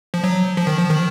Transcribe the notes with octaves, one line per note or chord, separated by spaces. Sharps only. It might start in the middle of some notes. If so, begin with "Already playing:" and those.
F3
F#3
F3
D#3
F3
D#3